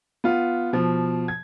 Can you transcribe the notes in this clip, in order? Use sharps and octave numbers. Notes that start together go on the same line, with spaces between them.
B3 F4
B2 F3
G#6